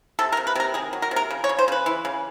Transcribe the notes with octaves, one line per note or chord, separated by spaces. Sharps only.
C3 A4
A#4
C3
B4
C3 A#4
D#3 G#4
F#3
A#4
C3
A#4
C#3
C#5
C#3
C5
C#3 B4
E3
C#3